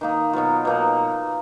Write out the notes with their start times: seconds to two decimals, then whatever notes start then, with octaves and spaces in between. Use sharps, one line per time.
0.01 D#3 A#3 D#4
0.33 B2 F#3 B3 F4
0.65 B2 A#3 D#4